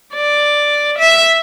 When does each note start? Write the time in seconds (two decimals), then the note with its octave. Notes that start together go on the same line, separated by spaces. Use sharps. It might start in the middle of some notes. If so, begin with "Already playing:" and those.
0.15 D5
0.98 E5